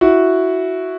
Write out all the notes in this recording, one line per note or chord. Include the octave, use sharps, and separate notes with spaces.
E4 F#4